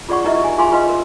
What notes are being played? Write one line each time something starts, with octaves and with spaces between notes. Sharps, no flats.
F4 G#4 D5 F#5 C#6
D#4 E4 G4 A#4 D#5 E5
G#5
F4 G#4 F5 G#5 B5 C6
F4 G#4 B4 D#5 F5 C6
A#4